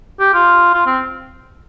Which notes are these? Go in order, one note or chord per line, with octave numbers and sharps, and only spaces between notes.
G4
F4
F4
C4